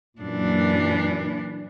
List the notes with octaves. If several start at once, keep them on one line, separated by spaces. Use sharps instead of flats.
F#2 A#2 E3 D4